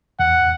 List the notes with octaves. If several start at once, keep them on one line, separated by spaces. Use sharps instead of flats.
E2 F#5